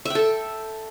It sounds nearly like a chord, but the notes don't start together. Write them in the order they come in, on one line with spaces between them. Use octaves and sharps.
E5 G5 A4